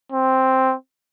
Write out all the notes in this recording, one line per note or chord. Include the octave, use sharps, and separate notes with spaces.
C4